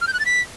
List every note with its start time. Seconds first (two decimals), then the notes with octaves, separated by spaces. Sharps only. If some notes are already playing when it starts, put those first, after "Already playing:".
0.01 F6
0.07 G6
0.13 F#6
0.20 A6
0.26 B6